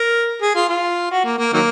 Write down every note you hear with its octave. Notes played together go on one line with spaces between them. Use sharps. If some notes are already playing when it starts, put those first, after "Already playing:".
Already playing: A#4
G#4
F4
F4
F#4
A#3
A#3
D#3 F#3 A#3